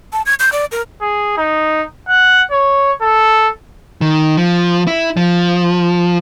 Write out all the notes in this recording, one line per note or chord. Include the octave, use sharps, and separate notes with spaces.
A5
G#6
G6
D5
A#4
G#4
D#4
F#5
C#5
A4
D#3
F3
E4
F3